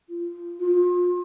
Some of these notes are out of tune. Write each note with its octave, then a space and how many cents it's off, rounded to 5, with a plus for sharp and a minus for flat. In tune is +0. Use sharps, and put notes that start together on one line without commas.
F4 -15
F4 +35